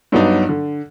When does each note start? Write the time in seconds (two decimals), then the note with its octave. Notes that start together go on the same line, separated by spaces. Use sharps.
0.12 G2 F#3 B3 D4 D#4
0.49 D3